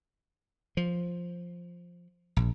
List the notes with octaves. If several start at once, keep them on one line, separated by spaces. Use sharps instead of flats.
F3
A#1